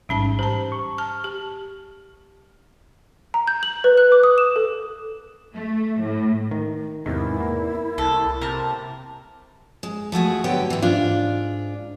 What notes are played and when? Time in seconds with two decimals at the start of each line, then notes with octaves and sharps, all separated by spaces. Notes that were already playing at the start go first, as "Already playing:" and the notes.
0.09 A1 G#2 G3 C#4 A5
0.39 G4 C5 A5 A#5
0.72 C#6
0.98 A5 F6
1.24 G4
3.34 A#5
3.47 G6
3.63 F#7
3.84 B4
3.98 F#6
4.12 D6
4.23 D#6
4.38 E7
4.56 A4
5.54 A3
6.02 A2
6.51 D#3
7.06 E2 G#2 C3 D#3 E4
7.41 A#3
7.98 C2 A4
8.41 C3 A#4 A5
9.83 G#3
10.12 F3 A3 F#4 G#4
10.44 D3 F#3 B3 G4 G5
10.70 G#2 E3
10.82 G#2 D4 F4